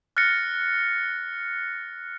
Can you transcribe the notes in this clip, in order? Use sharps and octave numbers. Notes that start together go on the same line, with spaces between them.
F6 F#6 A6 A#6 C#7